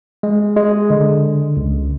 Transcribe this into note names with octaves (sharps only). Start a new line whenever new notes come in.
G#3
G#3
D3
C#2